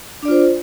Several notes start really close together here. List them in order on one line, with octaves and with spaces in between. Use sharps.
D4 D5 F4 C5